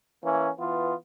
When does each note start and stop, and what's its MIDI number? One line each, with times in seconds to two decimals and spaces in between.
0.23 0.49 52
0.23 0.49 58
0.23 0.49 61
0.58 0.93 52
0.58 0.93 59
0.58 0.93 65